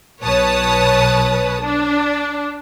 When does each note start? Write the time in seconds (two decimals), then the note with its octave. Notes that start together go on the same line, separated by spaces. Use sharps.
0.22 B1 B4 C#5 A5 D#6
1.62 D4